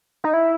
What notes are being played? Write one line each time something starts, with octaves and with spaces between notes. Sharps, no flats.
D#4
E4